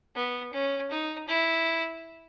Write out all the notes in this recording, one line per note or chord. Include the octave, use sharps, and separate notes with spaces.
B3
C#4
D#4
E4